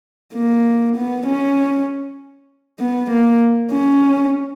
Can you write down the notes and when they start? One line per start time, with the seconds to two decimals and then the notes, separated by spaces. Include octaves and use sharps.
0.34 A#3
0.96 B3
1.27 C#4
2.80 B3
3.10 A#3
3.72 C#4